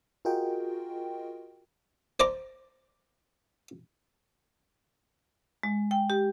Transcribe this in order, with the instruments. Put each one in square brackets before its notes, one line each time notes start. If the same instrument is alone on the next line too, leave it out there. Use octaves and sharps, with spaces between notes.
[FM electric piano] F4 F#4 G#4 A#4 D#5 G5
[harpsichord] C5 D5 A#5 D6
[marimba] G#3
G5
G4